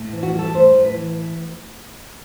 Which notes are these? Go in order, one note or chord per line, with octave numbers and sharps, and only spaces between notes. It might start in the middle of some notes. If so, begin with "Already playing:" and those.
Already playing: A2
E3
F#4
G3
A4
A2 C5
A2
B4
E3